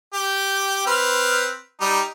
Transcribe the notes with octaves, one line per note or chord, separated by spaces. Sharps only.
G4
C4 B4 F6
G3 D#4